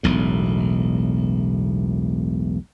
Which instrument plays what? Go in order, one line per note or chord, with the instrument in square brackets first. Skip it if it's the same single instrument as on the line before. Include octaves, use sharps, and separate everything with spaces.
[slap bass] E1 B1 A2